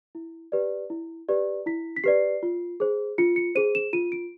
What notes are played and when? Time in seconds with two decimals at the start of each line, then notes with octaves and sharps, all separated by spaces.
0.15 E4
0.52 G4 B4 D5
0.90 E4
1.29 G4 B4 D5
1.66 E4 B6
1.96 B6
2.04 G4 B4 D5 C7
2.43 F4
2.80 G#4 C5
3.18 F4 C#7
3.36 C#7
3.55 G#4 C5 D#7
3.75 E7
3.93 F4 D#7
4.12 D7